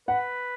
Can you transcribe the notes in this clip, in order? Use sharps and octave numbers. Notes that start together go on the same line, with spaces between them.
B4 F#5